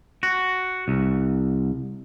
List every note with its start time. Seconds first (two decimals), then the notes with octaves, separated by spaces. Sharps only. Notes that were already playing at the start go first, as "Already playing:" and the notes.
0.23 F#4
0.88 C2